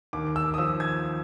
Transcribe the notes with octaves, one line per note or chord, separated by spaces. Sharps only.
D#2 D6
E6
D#6
F3 E6
G#6